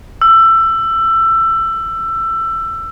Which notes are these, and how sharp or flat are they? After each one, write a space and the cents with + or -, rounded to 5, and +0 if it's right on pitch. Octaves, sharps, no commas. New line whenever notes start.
E6 +20